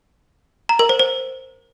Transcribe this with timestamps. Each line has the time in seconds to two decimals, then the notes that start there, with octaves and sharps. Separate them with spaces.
0.69 A#5
0.79 A#4
0.89 C5
0.99 C5